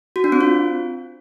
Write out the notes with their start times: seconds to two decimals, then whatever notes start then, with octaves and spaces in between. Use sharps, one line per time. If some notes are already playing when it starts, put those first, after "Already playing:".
0.16 F#4
0.24 D4
0.32 C4
0.41 F4